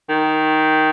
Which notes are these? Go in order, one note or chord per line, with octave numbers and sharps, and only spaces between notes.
D#3